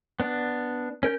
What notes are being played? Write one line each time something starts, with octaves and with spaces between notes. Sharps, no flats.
B3 D4
C#4 A#4 G6